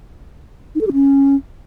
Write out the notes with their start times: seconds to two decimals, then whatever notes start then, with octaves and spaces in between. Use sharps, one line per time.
0.75 D#4
0.81 A4
0.87 G4
0.93 C#4